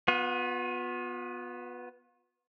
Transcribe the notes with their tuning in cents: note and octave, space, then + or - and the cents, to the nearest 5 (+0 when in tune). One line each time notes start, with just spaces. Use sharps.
B3 +0 F4 +45